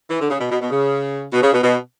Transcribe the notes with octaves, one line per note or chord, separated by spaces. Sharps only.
E3
D3
C#3
B2
B2
B2
C#3
B2
C#3
B2
B2